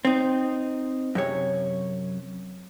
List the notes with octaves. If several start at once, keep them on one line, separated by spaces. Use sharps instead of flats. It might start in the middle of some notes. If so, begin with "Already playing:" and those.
C4 D#4
F#2 C3 C#5